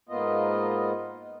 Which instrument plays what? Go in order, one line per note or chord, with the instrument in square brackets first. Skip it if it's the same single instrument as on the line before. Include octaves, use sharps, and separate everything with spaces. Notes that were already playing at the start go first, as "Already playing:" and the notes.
[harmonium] G#2 A#3 B3 F4 D#5